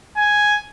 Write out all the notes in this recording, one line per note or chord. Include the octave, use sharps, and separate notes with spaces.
G#5